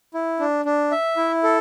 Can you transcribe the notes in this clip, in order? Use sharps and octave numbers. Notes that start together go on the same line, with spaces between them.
E4
D4
D4
E5
E4
A4